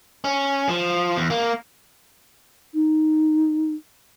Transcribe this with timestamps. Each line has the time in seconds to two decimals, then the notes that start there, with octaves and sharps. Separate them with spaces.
0.24 C#4
0.69 F3
1.16 E2
1.31 A#3
2.74 D#4